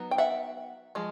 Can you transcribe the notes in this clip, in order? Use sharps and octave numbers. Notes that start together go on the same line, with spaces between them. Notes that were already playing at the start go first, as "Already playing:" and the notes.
Already playing: F#3 B3 D#4
G5
E5 F#5
F3 G#3